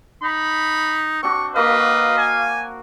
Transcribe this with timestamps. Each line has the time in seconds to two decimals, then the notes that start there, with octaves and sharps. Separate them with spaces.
0.23 D#4 B5
1.23 C4 D4 F#4 C#6
1.56 A#3 F#4 B4 D#5 F5
2.18 G#5